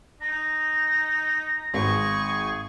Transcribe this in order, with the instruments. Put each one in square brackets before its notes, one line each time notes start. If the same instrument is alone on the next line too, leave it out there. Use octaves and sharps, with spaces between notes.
[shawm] D#4 [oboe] A#5
[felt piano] G#1 [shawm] G#4 [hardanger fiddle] C#6